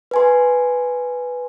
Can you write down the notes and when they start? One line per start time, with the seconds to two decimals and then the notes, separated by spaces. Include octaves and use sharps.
0.11 B4 G#5 C6